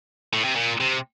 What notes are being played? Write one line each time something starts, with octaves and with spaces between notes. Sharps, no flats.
A2
C3
A#2
C3